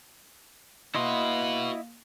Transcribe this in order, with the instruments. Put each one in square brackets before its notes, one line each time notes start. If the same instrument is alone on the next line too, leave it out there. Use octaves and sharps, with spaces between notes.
[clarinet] A#3 [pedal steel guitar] E4 D#5 C6 [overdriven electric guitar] F#4 B4